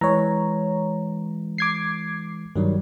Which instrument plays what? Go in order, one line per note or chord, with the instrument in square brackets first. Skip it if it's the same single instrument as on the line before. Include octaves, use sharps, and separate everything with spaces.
[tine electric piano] E3 G#3 [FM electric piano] C#5 A#5
[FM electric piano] D6 G#6 C7
[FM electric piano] G2 [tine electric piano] D#3 F#3 G3